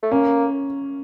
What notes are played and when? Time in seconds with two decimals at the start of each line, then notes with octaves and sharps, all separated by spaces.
0.03 A3
0.11 A#3 C#4